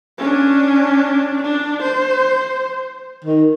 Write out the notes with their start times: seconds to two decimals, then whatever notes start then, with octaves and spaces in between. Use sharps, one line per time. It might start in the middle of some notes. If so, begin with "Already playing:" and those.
0.18 C#4 D4
1.43 D4
1.82 C5
3.25 D#3